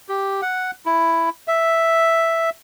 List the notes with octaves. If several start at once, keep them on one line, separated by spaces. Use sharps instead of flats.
G4
F#5
E4
E5